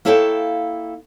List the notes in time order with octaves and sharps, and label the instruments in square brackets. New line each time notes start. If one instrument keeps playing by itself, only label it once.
[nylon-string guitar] A#3 E4 A4 C#5 F5 G5